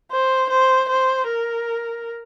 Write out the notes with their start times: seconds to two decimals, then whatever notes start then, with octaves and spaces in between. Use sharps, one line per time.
0.11 C5
0.50 C5
0.89 C5
1.28 A#4